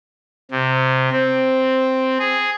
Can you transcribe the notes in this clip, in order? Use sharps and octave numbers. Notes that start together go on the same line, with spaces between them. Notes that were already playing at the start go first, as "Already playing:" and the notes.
C3
C4
G#4